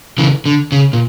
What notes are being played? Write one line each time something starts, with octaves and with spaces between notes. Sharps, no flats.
C#3 E3
D3
C#3
A#2